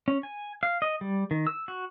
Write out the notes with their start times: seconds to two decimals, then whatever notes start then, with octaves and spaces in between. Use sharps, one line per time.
0.08 C#4
0.23 G#5
0.63 F5
0.82 D#5
1.01 G3
1.31 D#3
1.47 E6
1.68 F#4